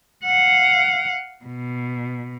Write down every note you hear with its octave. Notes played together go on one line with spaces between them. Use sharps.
F5 F#5
B2